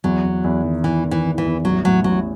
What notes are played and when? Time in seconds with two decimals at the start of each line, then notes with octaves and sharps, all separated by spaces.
0.04 E2 F#3
0.25 E2
0.44 E2
0.64 D#3
0.84 E2 E3
1.04 D#3
1.11 E3
1.25 E2
1.38 E3
1.45 E2
1.65 A1 F#3
1.84 A2 F#3
2.04 A1 F#3